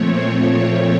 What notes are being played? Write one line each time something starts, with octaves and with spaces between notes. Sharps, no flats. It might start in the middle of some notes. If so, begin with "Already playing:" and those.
Already playing: A#2 F3 A3 C4 C#5